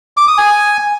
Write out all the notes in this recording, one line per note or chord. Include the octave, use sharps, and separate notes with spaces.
D6
D#6
G#5